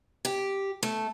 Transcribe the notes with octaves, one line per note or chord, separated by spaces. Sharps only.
G4
A3